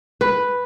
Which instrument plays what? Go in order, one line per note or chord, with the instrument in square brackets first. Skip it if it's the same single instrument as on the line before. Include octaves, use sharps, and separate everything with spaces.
[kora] B4